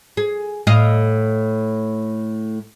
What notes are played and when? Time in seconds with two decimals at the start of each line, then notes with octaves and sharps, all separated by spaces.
0.17 G#4
0.67 A2 D#5 F5